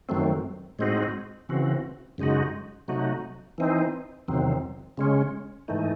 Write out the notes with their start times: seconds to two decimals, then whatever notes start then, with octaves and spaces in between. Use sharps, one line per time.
0.09 F#2 D#3 F#3 A3 C4
0.79 A2 G#3 C4 D#4 F#4
1.49 C#3 E3 C4 F#4
2.18 F#2 C#3 G#3 D#4 F#4
2.88 C3 F#3 A3 D#4 F#4
3.58 E3 C4 D#4
4.28 E2 C3 D#3 F#3 C4
4.97 C#3 G#3 C#4
5.68 G#2 E3 A3 D#4